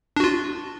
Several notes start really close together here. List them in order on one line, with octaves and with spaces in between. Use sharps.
D4 F#4 F4